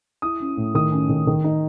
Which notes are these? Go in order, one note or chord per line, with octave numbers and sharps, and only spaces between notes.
E4 D#6
C#4
A2
D#3 D#6
C#4
D#3
D#3
D#4